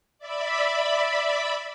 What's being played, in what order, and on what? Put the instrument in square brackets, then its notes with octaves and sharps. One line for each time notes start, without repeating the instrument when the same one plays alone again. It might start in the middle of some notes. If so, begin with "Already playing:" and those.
[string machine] D5 E5 B5